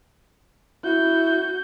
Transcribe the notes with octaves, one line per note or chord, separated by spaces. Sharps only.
E4 F#4 G6